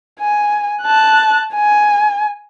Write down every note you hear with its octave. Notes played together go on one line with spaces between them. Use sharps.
G#5
A5 F#6
G#5